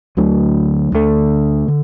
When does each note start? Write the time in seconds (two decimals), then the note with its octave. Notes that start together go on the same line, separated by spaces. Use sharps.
0.17 D2 D3 F#3 A3
0.92 D2 D3 F#3 A3
1.68 D3